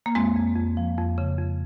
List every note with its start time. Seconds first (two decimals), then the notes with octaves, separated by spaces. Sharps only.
0.06 A#3
0.15 F2 G#3 C4
0.36 F2
0.56 F2
0.77 F3
0.98 F2
1.18 C#3
1.39 F2